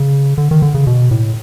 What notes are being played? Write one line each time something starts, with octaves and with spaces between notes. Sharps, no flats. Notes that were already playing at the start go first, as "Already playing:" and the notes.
Already playing: C#3
D3
D#3
D3
C#3
B2
A2